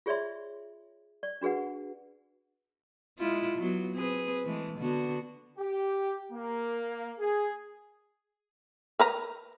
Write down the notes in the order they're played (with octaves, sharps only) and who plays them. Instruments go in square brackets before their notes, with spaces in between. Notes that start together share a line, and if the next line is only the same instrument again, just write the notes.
[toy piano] F4 G#4 C#5 D5 E5 C6
D5
D4 F#4 G#4 B4 F#5
[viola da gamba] G#3 E4 F4
F#3 B3
C4 G#4 B4
E3 G#3 A3
D3 B3 F#4
[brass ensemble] G4
A#3
G#4
[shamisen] A#4 B4 A#5